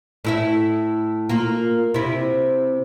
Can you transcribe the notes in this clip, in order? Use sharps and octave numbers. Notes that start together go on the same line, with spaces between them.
A2 E4 E5
A#3 F4
C3 E4